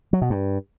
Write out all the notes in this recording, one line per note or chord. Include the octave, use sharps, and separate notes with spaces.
F#3
B2
G2